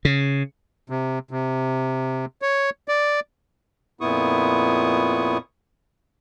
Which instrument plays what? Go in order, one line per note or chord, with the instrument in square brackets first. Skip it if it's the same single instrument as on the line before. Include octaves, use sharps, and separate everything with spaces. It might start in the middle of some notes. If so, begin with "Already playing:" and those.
[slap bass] C#3
[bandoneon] C3
C3
C#5
D5
[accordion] F2 A#2 B3 E4 C#6 D#6